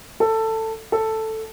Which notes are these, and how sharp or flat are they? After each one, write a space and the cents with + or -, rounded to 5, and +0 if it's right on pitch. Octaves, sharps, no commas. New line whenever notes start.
A4 +15
A4 +5